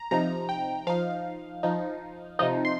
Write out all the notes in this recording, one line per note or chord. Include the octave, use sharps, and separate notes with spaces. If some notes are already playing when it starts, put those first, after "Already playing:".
Already playing: A#5
C3 F3 D#4 A#5
G5
F3 D#4 F5
F3 D#4
C3 F3 D#4 D#5
C6